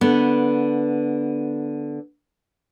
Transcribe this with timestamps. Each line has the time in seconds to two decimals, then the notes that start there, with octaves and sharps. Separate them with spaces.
0.01 D3 B3